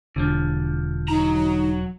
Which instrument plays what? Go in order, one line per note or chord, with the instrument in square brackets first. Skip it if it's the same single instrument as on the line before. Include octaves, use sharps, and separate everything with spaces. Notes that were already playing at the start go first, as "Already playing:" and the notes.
[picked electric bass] E1 [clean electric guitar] D3 F3
[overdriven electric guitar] F#3 A#5 [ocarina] D#4